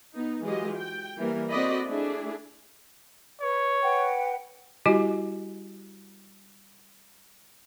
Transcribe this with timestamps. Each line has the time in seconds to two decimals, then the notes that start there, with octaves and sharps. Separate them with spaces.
0.15 B3 D#4
0.43 E3 F#3 G#3 F4 G4 D#5
0.77 G5
1.17 E3 G3 A#3 A#4
1.50 C4 F#4 A4 D5 D#5 B5
1.87 A3 D4 E4 G#4
3.41 B4 C#5
3.83 B4 F#5 G5
4.86 G3 E4 F#4 G4 D#5 G#5